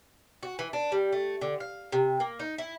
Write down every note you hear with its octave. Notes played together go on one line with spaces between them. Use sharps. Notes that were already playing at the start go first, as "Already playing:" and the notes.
F#4
E3
D4
G3
A3
D3
F5
C3
A#3
D#4
E4